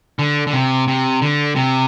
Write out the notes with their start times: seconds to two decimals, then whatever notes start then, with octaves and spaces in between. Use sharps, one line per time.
0.19 D3
0.47 D3
0.53 C3
0.88 C3
1.22 D3
1.56 C3